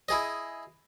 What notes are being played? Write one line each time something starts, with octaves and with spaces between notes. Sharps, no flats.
E4 G#4 D#5